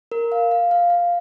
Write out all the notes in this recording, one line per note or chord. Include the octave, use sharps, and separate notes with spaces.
A#4
F5
F5
F5
F5